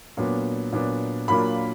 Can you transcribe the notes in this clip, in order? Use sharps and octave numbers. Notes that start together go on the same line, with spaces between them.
A#2 F#3 B3 D4
A#2 F#3 B3 D4
A#2 F#3 A#3 D4 F4 B5